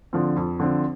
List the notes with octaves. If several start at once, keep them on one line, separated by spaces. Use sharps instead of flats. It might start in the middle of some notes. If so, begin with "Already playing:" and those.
D3 F3 C4
F2
D3 F3 C4